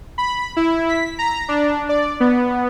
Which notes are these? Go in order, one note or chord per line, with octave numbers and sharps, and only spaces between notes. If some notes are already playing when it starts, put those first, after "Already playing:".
B5
E4
B6
A#5
D4
D5
B3